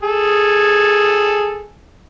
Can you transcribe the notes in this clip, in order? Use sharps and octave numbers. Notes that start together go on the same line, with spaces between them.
G#4 A4